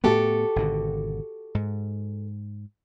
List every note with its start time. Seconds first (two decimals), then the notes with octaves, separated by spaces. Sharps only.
0.04 A2 A3 B3 F#4 G4 A4
0.56 G#1 B2 D3
1.55 G#2